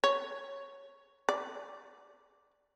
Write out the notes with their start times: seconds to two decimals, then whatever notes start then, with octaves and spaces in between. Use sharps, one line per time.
0.04 C#5
1.29 D5